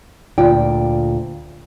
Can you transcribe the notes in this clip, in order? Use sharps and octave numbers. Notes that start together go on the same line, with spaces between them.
D2 A#2 F4 D5 G5